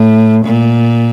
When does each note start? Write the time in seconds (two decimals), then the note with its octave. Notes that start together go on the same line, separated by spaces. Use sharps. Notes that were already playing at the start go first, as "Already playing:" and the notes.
Already playing: A2
0.46 A#2